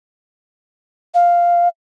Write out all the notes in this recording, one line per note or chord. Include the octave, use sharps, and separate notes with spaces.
F5